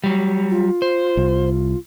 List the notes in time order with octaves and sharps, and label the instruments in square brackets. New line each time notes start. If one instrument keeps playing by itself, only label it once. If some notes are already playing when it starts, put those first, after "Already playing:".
[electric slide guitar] F#3 G3
[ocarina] F4
[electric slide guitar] C5
[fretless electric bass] C2